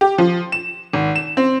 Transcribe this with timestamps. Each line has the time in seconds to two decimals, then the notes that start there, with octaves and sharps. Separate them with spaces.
0.01 G4
0.18 F3
0.52 E7
0.93 G#1
1.16 E7
1.37 C4